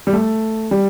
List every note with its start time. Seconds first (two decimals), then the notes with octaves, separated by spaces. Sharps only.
0.07 G3
0.13 A3
0.71 G3